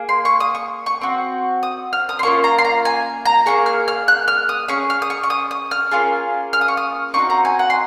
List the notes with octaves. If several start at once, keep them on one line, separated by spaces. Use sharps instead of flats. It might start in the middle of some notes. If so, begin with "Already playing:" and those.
Already playing: A#3 G#4
C6
C#6
D#6
C#6
C#6
C4 F#4
D#6
F6
D#6
C6
A#3 C#4 F4 C#6
A#5
C6
A#5
G#5
A#5
A#3 F4 G#4 C#6
F6
F6
F#6
F6
D#6
C#4 G#4 C#6
F6
D#6
C#6
C#6
D#6
D#6
F6
A#3 C#4 F4 G#4
F6
D#6
C#6
D#6
C4 D#4 F#4 C#6
A#5
G#5
F#5
C6